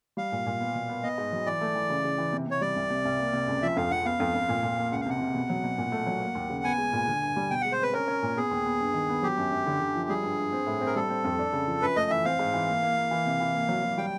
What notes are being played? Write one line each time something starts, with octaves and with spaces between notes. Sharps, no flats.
G3 F5
A#2
A#2
B3
B2
B3
B3 D#5
G#2
F#3
E3 D5
A3
E3
C#3
C#3
E3
C3
C3 C#5
G3 D5
C2
C3
C2
A#3
C3
C#2
F3 E5
F2 F5
F2 F#5
B3 F5
F2
F2
A#2
A#2
A#3
C#2 F#5
F5
C3 F#5
C3
B2
F#3
B2
A#2
A3
F#3
A#3
D#2
C#3
B3 G#5
G#3
A#2
D3
G2
G3
B2 G5
G#3 F#5
C5
C4 B4
C#4 A#4
C#4
A#2
B3 G#4
D#2
B3
G2
D#3
B3
F#3 G4
F#2
F#2
D3
D3
F3
G3 G#4
G2
G2
C4
A2
C4
A#4
G3 A4
C4
F2
D4
C#3
F3
F#2 B4
A3 D#5
E3 E5
C4 F5
G#2
E3
A#3
A#3
A#3
E3
C3
E3
A#3
F#3
F#3
G3 G5